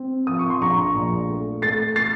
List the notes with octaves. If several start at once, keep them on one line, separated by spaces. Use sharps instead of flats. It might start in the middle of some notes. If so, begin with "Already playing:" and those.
Already playing: C4
F3 D#6
C#6
C6
A#1 A#5 C#6
A#2
A3
A3 A6 C7
A6 C7